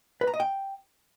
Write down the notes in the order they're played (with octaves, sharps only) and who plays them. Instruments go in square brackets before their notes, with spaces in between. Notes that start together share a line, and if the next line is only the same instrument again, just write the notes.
[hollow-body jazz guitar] B4
A#5
D#5
G5